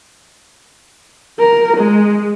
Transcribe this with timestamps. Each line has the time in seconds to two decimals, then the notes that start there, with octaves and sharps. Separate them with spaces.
1.40 A#4
1.77 G#3